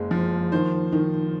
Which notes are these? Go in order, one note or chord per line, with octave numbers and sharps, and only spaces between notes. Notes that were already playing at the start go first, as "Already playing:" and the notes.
Already playing: F#1 G#3
F3
D#3 C5
D#3